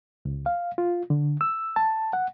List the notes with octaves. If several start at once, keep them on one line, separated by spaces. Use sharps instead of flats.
C#2
F5
F4
D3
E6
A5
F#5